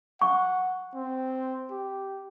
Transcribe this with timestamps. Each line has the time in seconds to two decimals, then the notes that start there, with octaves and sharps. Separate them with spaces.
0.22 F#5 C#6
0.94 C4
1.71 G4